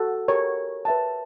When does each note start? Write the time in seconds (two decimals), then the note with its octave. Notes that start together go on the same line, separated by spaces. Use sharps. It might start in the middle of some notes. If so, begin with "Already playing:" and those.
Already playing: F#4 A4
0.28 G4 A#4 C#5
0.85 B4 E5 A5